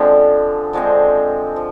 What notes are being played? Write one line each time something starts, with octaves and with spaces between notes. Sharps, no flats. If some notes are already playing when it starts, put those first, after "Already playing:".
Already playing: D3 F3 G#3 C4
D3 F3 G#3 C4
F3